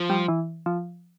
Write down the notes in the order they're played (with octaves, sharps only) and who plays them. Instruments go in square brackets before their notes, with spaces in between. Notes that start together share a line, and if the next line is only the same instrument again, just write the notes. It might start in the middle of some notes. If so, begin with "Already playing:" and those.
Already playing: [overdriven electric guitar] F3
[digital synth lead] G3
E3
F3